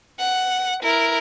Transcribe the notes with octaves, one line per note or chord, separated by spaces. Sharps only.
F#5
E4 A#4